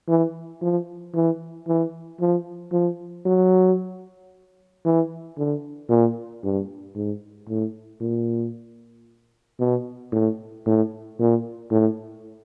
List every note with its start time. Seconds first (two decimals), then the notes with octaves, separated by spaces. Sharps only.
0.08 E3
0.62 F3
1.14 E3
1.68 E3
2.20 F3
2.73 F3
3.26 F#3
4.85 E3
5.38 D3
5.90 A#2
6.44 G2
6.96 G#2
7.49 A2
8.01 A#2
9.60 B2
10.12 A2
10.66 A2
11.19 A#2
11.71 A2